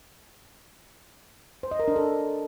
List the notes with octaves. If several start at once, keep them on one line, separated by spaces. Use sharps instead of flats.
C5
D#5
A#4
D4
A4